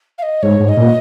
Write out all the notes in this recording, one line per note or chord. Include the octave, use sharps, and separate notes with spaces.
F5
D#5
G#2 C#5
G#2
D#5
A#2